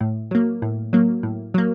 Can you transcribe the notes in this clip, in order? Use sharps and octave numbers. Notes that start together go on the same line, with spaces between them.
A2
F#3 A#3
A2
F#3 A#3
A2
F#3 A#3